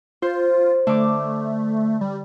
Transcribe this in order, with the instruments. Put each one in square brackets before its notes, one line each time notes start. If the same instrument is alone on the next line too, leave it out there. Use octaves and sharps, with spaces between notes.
[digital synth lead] F4 [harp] C5
[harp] D3 D6 [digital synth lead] A3
[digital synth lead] G3